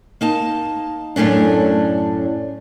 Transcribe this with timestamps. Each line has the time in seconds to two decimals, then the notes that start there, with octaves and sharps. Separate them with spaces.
0.21 A#3 D#4 A5
1.16 F#2 A2 A3 C#4 D4